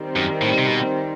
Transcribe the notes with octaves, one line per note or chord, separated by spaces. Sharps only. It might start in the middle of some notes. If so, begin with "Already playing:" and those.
Already playing: D#3 G3 C4
F#2
A2
C3
B2